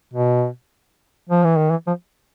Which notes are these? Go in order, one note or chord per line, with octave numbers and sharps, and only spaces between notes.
B2
F3
E3
D#3
E3
F3